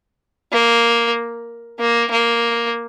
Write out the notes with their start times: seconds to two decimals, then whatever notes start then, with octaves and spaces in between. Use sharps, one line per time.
0.52 A#3
1.79 A#3
2.11 A#3